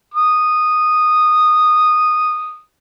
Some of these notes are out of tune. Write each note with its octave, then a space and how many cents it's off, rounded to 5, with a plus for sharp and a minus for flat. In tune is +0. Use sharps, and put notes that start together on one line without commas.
D#6 -10